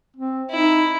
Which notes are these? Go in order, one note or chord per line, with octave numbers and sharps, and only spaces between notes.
C4
D#4 E4